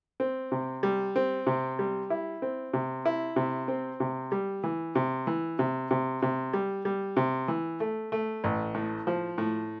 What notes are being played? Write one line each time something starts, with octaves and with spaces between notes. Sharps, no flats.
C4
C3
G3
C4
C3
G3
E4
C4
C3
E4
C3
C4
C3
G3
E3
C3
E3
C3
C3
C3
G3
G3
C3
E3
A3
A3
A1
A2
F3
A2